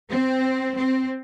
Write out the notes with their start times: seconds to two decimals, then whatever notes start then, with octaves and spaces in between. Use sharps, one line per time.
0.10 C4
0.76 C4